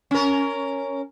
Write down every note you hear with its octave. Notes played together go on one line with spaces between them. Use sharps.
C#4 A#4